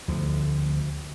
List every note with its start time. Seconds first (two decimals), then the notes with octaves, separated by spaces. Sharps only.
0.08 D2 D3 F3